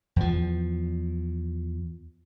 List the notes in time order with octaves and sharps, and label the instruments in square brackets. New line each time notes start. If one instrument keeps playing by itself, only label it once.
[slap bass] E2 F3